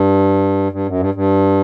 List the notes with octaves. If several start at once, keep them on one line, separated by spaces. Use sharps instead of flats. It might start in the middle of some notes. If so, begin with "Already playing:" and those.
Already playing: G2
G2
F#2
G2
G2